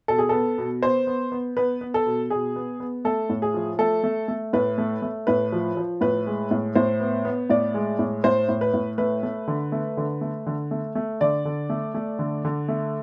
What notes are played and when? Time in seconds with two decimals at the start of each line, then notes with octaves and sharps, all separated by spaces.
0.08 B2 A4
0.18 G#4
0.29 B3 A4
0.58 B2
0.82 B3 C5
1.07 B3
1.32 B3
1.57 B3 B4
1.81 B3
1.94 A4
2.06 B2
2.30 B2 G#4
2.56 B3
2.80 B3
3.05 A3 A4
3.29 A2
3.42 G#4
3.54 F3
3.79 A3 A4
4.04 A3
4.28 A3
4.53 A2 B4
4.78 A3
5.02 A3
5.27 A2 B4
5.53 F3
5.77 F3
6.01 A2 B4
6.27 G#3
6.51 A2
6.75 A2 C5
7.00 B3
7.25 B3
7.50 A2 D5
7.74 G#3
7.99 A2
8.24 A2 C5
8.49 A2
8.61 B4
8.74 A2
8.98 A3 B4
9.23 A3
9.48 D3
9.72 A3
9.97 D3
10.21 A3
10.46 D3
10.71 A3
10.95 A3
11.21 D3 D5
11.45 D3
11.70 A3
11.94 A3
12.19 D3
12.45 D3
12.68 A3